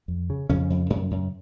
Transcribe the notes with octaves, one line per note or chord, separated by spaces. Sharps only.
F2
C#3
F2 C#3 C#4
F2
F#2
F#2